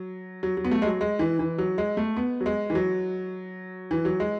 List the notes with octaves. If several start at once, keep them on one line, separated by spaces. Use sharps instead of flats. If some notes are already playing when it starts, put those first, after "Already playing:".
Already playing: F#3
F#3
F#3
B3
A3
G#3
F#3
G#3
E3
E3
F#3
G#3
A3
B3
F#3
G#3
E3
F#3
E3
F#3
G#3